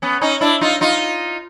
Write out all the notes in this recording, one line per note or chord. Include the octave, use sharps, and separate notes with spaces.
B3 C#4
C#4 D#4
D4 E4
D#4 F4
D#4 F4